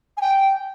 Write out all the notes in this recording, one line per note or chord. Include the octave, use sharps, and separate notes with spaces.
G#5
G5